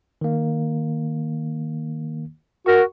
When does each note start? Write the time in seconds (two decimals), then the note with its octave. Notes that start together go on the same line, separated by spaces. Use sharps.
0.21 D#3 A#3
2.66 F#4 A#4 F#5 C#6